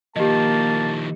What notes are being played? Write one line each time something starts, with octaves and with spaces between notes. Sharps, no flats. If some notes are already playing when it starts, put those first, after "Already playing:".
D#3 F3 A#3 G4 D#5 A5